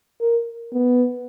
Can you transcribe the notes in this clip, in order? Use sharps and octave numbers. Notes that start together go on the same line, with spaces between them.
A#4
B3